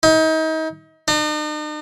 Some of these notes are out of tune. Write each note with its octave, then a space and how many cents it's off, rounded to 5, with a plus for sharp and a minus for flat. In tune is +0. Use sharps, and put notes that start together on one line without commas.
D#4 +35
D#4 -45